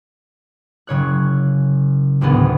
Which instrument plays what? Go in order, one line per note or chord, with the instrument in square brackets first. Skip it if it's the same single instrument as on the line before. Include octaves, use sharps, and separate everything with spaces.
[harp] F#1 C#3 C#5 F#6
G#1 D2 A2 B3 G#4